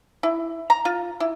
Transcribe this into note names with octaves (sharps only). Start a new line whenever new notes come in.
E4
A#5
F4
E4